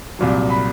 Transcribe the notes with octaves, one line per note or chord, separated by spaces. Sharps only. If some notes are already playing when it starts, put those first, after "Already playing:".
C2 A#2 F#3
B5